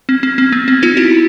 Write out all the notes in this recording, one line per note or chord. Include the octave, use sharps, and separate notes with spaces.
C4
C4
C4
B3
C4
D#4 F4
E4 F#4